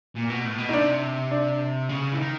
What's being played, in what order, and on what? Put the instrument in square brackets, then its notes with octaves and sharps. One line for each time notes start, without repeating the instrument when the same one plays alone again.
[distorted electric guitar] A#2
B2
A2
B2
[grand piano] D#4
[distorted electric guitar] C3 [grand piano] D4
[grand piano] D4
[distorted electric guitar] C#3
E3
D#3